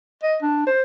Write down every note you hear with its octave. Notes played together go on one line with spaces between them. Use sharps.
D#5
D4
C5